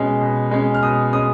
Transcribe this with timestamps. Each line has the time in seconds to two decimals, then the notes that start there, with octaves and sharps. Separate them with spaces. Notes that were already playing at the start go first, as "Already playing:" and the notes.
Already playing: B2 G#3 C#4
0.21 B2
0.51 G#3 C#4
0.74 F6
0.83 B2 D#6
1.13 G#3 C#4 D#6